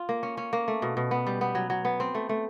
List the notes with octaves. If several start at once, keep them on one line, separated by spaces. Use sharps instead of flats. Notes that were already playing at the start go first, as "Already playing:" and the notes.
Already playing: F4
A#3
C#4
C#4
A#3
A3
B2
B2
B3
G3
B3
F#3
F#3
B3
C4
A3
A3